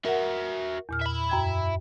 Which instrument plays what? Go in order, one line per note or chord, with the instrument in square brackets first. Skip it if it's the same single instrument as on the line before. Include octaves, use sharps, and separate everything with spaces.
[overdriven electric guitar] F#4 E5 [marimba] A#4 F#5
[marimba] E2 A#2 F6
[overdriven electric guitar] E5 B5
[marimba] F#2 G5 G#6